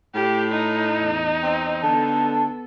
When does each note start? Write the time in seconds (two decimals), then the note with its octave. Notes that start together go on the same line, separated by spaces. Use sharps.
0.15 A2 G4
0.52 D#4
0.98 E2 D#5
1.42 C4
1.83 D3 B3 A4 A5